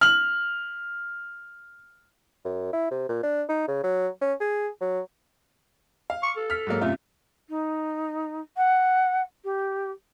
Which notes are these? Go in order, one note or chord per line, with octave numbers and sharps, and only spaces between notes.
F6 F#7
F#2
E4
C3
A#2
D4
D#4
C#3
F#3
C#4
G#4
F#3
F5
C#6
A4
F6 B6
G#2 F#3 A#3
F#2 C3 A3 F4
D#4
F#5
G4